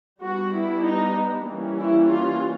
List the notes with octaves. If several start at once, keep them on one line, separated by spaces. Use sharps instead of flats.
G3 B3 D4 F#4
E4
D#4
E3 G3 A#3 C#4
E4
F4